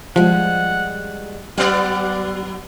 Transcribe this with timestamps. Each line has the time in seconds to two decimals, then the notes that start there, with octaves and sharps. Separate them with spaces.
0.16 F3 G3 G#3 F#5
1.58 F#3 B3 G4 D5 F#5